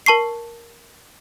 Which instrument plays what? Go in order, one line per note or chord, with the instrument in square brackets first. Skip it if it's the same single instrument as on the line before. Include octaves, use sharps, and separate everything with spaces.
[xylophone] A#4 A5 C#6 C7